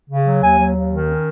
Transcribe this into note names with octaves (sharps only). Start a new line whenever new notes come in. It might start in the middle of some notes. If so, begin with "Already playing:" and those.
C#3
F#3
D#2 G#5
F#3
D#2
D#3
C#4